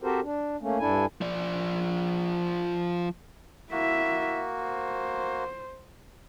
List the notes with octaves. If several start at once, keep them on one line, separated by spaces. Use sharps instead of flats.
C4 F#4 G4 A4 A#4 C5
D4
A3 A#3 C#4
G2 D4 E4 A4 G#5
F3 D5
A#3 E4 F#4 E5
C5